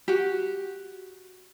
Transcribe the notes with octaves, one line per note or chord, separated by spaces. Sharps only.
F#4 G4